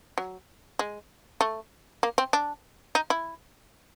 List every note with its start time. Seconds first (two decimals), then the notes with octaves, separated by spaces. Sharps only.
0.18 F#3
0.79 G#3
1.41 A3
2.03 A#3
2.18 C4
2.33 D4
2.95 D#4
3.10 E4